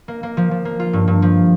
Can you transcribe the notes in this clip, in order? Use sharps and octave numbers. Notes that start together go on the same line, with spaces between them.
A#3
A#3
F3
F3
A#3
F4
G2
G2
F3